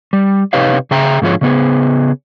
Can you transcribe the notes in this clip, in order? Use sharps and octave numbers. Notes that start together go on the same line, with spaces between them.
G3
C3 D#4 G4 B4 C#5 F5
C#3 G#4 E5 G5 A#5
G#2 D3 F3 F4 G#4 C#5
C#3 B3 G#4